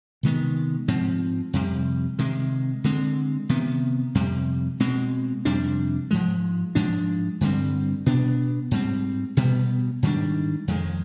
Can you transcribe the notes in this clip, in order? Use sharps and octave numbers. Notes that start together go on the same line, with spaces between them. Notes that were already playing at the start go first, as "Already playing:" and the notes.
C3 D#3 G#3 B3
G#2 F3 C4
F2 C3 G3
C3 D#3 G#3
D3 G#3 C4
C3 D#3 B3
F2 C3 G3
B2 G#3 C4
F2 C3 G3 D4
G#2 F3 G#3
G#2 F3 G#3 D4
G2 D3 G3 C4
B2 B3 D4
G#2 G3 C4
B2 G3 B3
G#2 D#3 G3 D4
F2 D#3 G#3